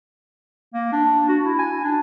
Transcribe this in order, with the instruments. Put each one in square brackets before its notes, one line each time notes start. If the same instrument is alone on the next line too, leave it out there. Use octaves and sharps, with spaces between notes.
[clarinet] A#3
D4
F#4
E4
G#5
D4